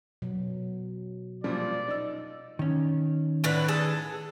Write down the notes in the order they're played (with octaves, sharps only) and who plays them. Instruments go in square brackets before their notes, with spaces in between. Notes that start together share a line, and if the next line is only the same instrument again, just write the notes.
[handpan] B2 F#3
[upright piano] A#2 F3 G3 [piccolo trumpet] D5
[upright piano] D#4 E6
[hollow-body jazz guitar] D#3 C#4
[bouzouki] A2 D3 B4
G#4 A4 A5